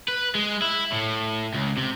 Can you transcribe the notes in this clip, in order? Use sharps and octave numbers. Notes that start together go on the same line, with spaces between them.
B4
G#3
E4
A2
C#2
C3